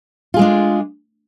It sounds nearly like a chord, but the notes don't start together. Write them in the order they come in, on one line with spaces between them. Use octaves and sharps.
F4 G#4 G#3 D4